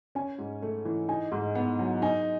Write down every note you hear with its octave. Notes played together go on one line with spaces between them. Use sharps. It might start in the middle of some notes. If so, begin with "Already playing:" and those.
C#4 G#5
G#2
A3
E3
D#4 G#5
G#2
B3
F#3
D#4 G#5